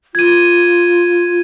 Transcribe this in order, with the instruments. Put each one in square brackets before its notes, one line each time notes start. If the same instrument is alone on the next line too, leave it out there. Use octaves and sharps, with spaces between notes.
[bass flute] F4 [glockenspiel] G#6 D#7